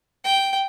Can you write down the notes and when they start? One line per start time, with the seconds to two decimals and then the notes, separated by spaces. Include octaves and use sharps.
0.25 G5